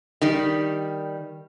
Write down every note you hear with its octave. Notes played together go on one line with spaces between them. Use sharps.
D#3 G3